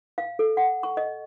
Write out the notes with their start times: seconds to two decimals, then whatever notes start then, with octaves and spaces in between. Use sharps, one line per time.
0.18 F5
0.39 A4
0.57 F#5
0.83 C#6
0.97 D#5